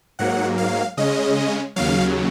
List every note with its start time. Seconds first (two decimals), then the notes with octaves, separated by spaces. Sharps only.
0.19 G#2 F#3 A#3 F#5
0.58 F5
0.97 C#3 G#3 C#4 D#5
1.76 D#2 C#3 F#3 F5